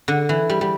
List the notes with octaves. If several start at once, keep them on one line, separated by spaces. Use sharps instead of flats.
D3
E3
G3
G3